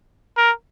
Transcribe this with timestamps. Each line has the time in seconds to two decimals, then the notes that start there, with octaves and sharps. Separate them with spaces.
0.37 A#4